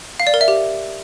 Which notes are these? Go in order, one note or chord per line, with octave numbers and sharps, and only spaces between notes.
F5
D5
A#4
E5
G4